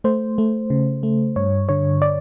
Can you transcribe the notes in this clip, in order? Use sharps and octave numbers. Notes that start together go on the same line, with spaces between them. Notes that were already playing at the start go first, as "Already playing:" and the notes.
A3 C5
A3
C#3
A3
G2 C#5
D3 C#5
D5